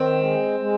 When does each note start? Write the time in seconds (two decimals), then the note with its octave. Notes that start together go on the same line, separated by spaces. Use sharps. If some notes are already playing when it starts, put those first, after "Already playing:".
Already playing: D#3 C4
0.18 G#3
0.60 G#3